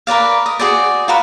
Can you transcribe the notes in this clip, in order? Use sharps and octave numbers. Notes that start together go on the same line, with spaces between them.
A#4 B4 D5 F5
D#5
F#4 G#4 C5 D5
F4 F#4 A#4 B4